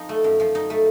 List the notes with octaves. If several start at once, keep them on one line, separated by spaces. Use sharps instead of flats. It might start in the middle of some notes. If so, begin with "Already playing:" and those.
Already playing: F3 D#4
A3
F#2
F3
D#4
A3